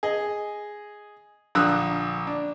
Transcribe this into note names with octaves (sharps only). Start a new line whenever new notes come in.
G#4 D#5
A#1 D3 D#6 E6 F#6
D4